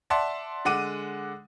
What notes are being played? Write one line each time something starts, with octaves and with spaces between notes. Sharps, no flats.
D5 E5 F#5 A5 C6
D3 G#3 F#5 D6 D#7